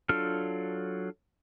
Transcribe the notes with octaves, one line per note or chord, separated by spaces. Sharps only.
F#3 D4 F4 A4 F6